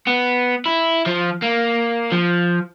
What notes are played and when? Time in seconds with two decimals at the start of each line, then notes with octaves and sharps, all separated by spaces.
0.07 B3
0.66 E4
1.06 F3
1.42 A#3
2.12 F3